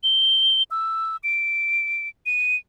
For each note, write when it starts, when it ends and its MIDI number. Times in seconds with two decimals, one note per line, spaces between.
0.03 0.63 103
0.71 1.16 88
1.24 2.09 98
2.26 2.56 99